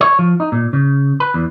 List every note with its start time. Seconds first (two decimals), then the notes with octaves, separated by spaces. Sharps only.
0.01 C#5
0.19 F3
0.40 D#4
0.52 A#2
0.73 C#3
1.20 B4
1.34 E2